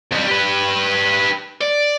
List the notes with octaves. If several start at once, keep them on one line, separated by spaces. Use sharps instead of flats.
F2 G3
G4 B4
D5